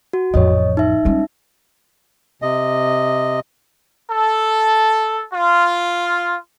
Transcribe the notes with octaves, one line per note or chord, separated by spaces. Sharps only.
F#4
A1 F2 C#5 D#5
D#4 E5
G3 C#4
C3 D#5
A4
F4